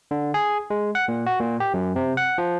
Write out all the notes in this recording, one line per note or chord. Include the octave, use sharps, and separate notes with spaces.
D3
G#4
G#3
F#5
A#2
F#4
A#2
G4
F#2
C3
F#5
F3